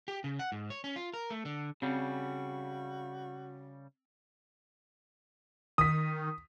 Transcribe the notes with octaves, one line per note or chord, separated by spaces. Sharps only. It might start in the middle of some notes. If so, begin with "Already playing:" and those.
G4
C#3
F#5
G#2
C#5
C#4
F4
A#4
A3
D3
C#3 G3 C4 F#4
D#3 D#6 B6